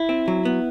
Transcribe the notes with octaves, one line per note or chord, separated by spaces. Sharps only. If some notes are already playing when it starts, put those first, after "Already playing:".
Already playing: E4
C4
F#3
B3